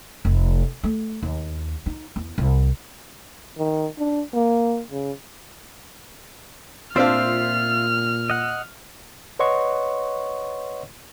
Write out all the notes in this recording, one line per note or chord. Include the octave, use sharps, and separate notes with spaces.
F1
A3
D#2
D#4
E2
C2
D#3
D4
A#3
C#3
A#2 C4 D4 F4 C5 E5 F5 F6
D#5 F#5
B4 C#5 D#5 F#5 C6 C#6